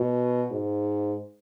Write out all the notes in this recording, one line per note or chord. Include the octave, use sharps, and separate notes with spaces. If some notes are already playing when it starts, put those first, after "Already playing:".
Already playing: B2
G#2